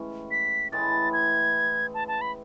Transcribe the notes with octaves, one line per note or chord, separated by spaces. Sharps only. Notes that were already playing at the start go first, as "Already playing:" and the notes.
Already playing: A2 E3 G#3 C#4
B6
A2 E3 G#3 A6
G#6
A5
A5
B5